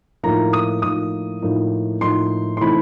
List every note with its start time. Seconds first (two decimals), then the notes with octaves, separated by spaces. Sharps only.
0.23 A2 F3 A#3 D#4 A#5
0.53 D#6
0.82 A2 F3 A#3 D#4 D#6
1.42 A2 F3 A#3 D#4
2.01 A2 F3 A#3 D#4 C6
2.57 C6
2.61 E3 A3 C4 D#4 B5